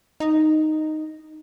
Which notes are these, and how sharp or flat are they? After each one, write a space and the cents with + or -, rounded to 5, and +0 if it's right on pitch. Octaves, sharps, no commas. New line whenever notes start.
D#4 -5